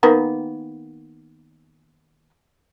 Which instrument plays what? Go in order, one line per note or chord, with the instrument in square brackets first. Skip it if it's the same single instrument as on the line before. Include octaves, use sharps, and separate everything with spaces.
[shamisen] D#3 A#3 B3